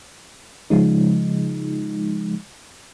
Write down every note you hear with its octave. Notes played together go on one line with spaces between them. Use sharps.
C#3 F3 G#3 D#4